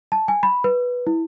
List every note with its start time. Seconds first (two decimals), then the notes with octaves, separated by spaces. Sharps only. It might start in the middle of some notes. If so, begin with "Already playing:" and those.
0.12 A5
0.28 G#5
0.43 B5
0.64 B4
1.07 E4